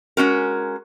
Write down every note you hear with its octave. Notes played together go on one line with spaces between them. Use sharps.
G#3 C#4 F#4 A#4